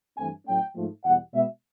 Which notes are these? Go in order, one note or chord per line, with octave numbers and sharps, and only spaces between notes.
G2 E3 A3 C4 G#5
A2 F#3 A3 C#4 G5
G#2 F3 A3
E2 B2 G3 F#5
B2 G#3 B3 E5